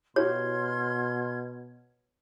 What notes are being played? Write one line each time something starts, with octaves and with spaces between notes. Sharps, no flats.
B2 E4 F#4 G4 C#5 C6 F6 G#6